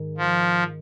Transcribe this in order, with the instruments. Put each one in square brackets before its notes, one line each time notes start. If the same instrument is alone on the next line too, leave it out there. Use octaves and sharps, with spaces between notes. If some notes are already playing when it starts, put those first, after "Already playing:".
Already playing: [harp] G#2 D#3 G#3
[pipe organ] F3